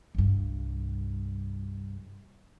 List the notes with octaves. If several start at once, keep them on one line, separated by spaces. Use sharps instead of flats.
C2 G2